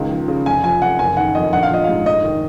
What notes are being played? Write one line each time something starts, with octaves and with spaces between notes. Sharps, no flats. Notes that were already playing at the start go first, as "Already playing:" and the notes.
Already playing: C#2 D#3
F3
C#3
F1 G#5
F3 G#5
F2 F#5
F#1 G#5
D#3 F#5
F2 D#5
A#1 F#5
F5
F3 D#5
G#2 F5
F1 D#5
D#3